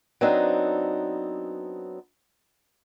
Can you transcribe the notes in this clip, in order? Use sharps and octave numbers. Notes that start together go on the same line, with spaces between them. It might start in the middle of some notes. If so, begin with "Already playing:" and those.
F#3 B3 C4 D4 D#4